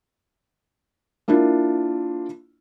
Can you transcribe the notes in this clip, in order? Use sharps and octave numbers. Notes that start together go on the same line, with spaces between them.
A#3 D4 E4 F4